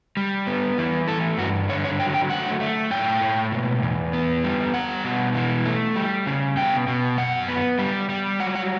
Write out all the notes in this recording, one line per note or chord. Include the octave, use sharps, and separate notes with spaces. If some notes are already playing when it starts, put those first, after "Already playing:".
G3
B3
E3
A3 A4
G2 F#4
D3 C#5
C#5
F#3 G5
G5
A3 F#5
A3
A2 G5
A2
B2
E2
B3
G3
G3 F#5
B2
E3
A3
G3
C#3
B2 G5
B2
F#2 F#5
B3
G3
G3
F#3 F#5
F#5